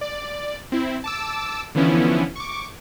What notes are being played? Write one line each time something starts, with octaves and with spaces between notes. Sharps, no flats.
D5
C4 E4
A5 D6 E6
D3 E3 F3 B3 C#4 E4
C#6 D6